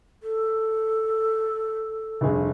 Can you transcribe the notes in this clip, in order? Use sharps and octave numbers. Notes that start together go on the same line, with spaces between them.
A4
F1 G2 G#4